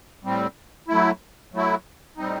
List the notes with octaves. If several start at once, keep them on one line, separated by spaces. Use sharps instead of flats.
A2 G3 C4
F#3 A3 E4
F#3 A3 E4
A2 G3 C4 D#4